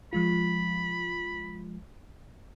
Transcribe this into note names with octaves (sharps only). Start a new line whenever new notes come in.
F3 G#3 F4 B5